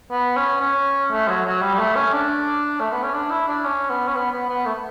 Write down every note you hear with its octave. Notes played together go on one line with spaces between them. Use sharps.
B3
C#4
C#4
A3
F#3
F#3
G3
G3
A3
C#4
D4
A3
B3
C#4
D4
E4
D4
C#4
B3
C#4
B3
B3
B3
A3